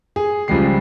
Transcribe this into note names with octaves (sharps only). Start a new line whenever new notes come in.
G#4
C#2 F3 G3 G#3 G4 C7